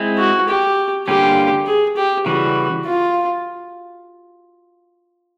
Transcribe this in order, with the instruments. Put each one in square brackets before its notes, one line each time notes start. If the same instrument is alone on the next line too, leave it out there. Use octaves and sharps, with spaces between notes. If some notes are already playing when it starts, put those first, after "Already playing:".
Already playing: [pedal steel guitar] G#3 C4 E4
[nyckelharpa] F#4
G4
[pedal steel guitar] D3 G3 A#3 C#4 F4 [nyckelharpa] G4
[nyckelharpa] G#4
G4
[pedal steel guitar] C#3 E3 G3 [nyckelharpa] F#4
[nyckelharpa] F4